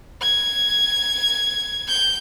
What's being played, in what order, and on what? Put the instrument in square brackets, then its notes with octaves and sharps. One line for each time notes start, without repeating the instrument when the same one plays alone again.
[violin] G#6
G6